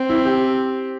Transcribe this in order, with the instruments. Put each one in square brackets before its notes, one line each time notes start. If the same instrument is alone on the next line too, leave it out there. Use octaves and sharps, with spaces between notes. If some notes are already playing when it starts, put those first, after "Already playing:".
Already playing: [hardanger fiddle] C4
[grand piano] E4
G4